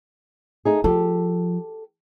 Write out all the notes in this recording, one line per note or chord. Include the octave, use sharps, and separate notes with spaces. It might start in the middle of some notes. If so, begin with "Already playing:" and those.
A3 D#4 G#4
F3 G4 A4